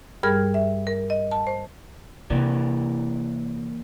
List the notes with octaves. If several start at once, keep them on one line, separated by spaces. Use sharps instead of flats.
G2 G3 G#4 A#4 F6 G#6
E5
A#4
D#5
A5
C5
C3 E3 A#3 D5